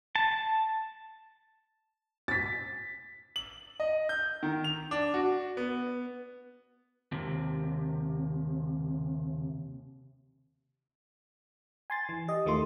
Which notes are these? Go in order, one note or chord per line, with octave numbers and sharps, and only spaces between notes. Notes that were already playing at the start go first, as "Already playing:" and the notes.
A5
A6 B6
F#7
D#5
G6
D#3
F7
D4
F#4
B3
D#2 C3
G#5 C6 A6
E3
G4 D#5
D#2 D#3 A3 F4 C6